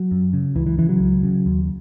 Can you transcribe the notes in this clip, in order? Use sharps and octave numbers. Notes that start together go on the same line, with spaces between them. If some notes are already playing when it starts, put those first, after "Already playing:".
Already playing: F#3
F#2
C#3
C#2 E3
E3
C#3 E3
F#3
C#2
C#3
D#2